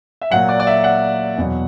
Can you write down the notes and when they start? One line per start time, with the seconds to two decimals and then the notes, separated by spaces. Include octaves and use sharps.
0.21 E5
0.31 A#2 F#3 F#5
0.49 D5
0.60 D5
0.67 E5
0.84 F#5
1.38 E2 B2 F#3